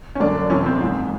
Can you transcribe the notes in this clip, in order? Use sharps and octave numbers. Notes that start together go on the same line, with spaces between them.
C#4
F#2 D3 D4
F2 C3 E3 C#4
C4
G#2 E3